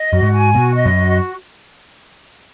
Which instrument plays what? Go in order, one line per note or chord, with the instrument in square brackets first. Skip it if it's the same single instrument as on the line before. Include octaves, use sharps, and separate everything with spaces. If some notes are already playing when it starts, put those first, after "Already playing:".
Already playing: [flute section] D#5
[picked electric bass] F#2 [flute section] F#4
[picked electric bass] G#2
[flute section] G#5
[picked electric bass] B2 [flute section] F#4
[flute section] D#5
[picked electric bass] F#2
[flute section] F#4